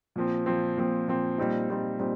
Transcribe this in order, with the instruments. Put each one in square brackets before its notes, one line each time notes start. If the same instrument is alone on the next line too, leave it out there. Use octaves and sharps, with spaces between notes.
[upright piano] A#2 F3 C4
A#2 F3 C4
A#2 F3 C4
A#2 F3 C4
A#2 G3 C4 D#4
A#2 G3 C4 D#4
A#2 G3 C4 D#4